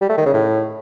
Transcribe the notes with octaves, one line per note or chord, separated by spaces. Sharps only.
G3
A3
D#3
C#3
A2